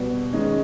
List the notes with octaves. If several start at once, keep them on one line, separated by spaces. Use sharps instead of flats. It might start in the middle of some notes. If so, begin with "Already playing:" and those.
Already playing: B2 G3 B3
D#3 G#3 C#4